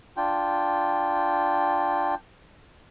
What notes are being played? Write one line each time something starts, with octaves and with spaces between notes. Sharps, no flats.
D4 F4 G5